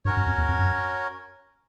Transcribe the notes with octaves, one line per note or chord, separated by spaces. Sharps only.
G2 C#4 F#4 A#4 C#5
F#2
F2
E2
F2
F#2